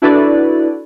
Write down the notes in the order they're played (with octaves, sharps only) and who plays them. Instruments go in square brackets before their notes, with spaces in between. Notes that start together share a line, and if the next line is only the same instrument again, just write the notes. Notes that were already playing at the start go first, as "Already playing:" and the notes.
[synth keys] D4 E4 F#4 A4 B4 D5